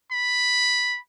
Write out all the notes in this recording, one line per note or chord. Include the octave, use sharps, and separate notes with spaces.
B5